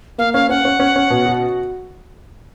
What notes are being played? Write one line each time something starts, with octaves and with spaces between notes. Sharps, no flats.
A#3 F5
C#4 F5
C#4 F#5
C#4
C#4
C#4
B2
F#4